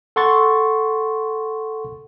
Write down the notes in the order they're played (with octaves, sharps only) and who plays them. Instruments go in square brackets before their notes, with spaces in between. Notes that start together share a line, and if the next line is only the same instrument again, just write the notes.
[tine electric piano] A4 F#5 C6 C#6 A6